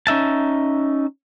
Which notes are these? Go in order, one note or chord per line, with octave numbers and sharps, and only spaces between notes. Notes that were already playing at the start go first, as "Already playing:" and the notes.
C#4 D#4 E5 A5